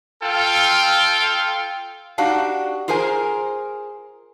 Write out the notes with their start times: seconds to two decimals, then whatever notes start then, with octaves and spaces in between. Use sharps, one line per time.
0.23 F4 A4 F5 G5
2.18 D4 D#4 F#4 G4 F5
2.88 F4 G#4 A#4 C5 G#5